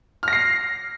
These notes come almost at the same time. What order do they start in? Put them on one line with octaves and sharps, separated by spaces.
F6 A#6 C7